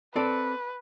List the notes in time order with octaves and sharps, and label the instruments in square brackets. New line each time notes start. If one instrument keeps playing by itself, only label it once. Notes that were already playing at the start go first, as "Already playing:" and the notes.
[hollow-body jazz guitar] C4 A4 D5 [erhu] B4